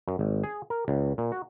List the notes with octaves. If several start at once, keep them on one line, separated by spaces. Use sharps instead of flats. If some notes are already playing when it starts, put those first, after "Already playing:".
F#2
G#1
G#4
A#4
C#2
A#2
F#4